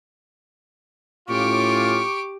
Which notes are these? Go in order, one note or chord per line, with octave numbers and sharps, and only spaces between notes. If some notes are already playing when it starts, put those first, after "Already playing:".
A2 C#4 F4 G4 C#6 D6